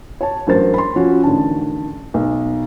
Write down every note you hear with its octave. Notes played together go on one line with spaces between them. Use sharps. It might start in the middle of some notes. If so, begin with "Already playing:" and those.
C#5 A5
A1 G2 F#3 A#4 C5 A6
B5 C6
F3 C#4 F#4
A1 D3 D#3 A5
B1